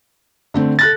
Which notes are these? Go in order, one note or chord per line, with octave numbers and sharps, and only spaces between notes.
D3 A3 C4
A4 F#6 A6 A#6